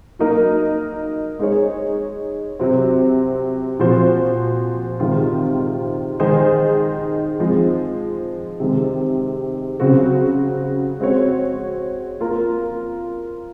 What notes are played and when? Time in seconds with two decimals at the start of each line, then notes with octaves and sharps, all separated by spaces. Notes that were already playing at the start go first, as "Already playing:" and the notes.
0.19 F#3 A#3 D#4 A#4
1.39 G#3 D#4 G#4 C#5
2.59 C3 F#3 C4
3.79 A#2 F3 C4 F#4 C5
5.00 C3 D#3 G#3 C4 F4
6.20 D#3 G#3 D#4 G#4 C5
7.40 F3 G#3 C4
8.60 C3 D#3 G#3
9.80 C#3 F#3 C4 F#4
11.00 G#3 C4 F#4 C#5
12.20 A#3 F4 A#4